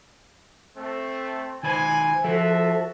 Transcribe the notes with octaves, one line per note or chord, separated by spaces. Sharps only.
A3 C4
D#3 B4 C5 G#5
F3 F#4 A4 C5 E5